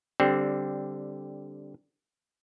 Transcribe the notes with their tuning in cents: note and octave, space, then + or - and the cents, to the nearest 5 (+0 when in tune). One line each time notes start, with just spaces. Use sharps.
D3 -10 G3 +0 C4 +0